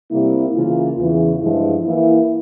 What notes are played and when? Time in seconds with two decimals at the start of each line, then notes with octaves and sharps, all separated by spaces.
0.11 C3 G3 A#3 E4
0.54 C#3 E3 A#3 F4
0.98 E2 C#3 E3
1.41 G2 F3 G#3 E4
1.85 E3 A#3 E4